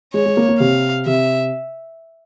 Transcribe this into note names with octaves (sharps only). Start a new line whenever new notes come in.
G#3 C#5
G#3
A#3
A#3
C3 F5
C3 E5